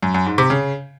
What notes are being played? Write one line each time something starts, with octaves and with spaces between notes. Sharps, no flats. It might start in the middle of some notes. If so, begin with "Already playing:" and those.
F#2
F#2
G#2
C3
C#3